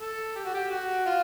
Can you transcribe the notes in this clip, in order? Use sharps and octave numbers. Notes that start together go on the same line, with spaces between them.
A4
G4
F#4
G4
F#4
F4